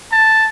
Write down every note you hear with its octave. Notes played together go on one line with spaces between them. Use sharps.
A5